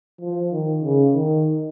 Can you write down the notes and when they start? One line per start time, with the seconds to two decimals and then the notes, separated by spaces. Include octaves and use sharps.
0.21 F3
0.52 D#3
0.83 C#3
1.13 D#3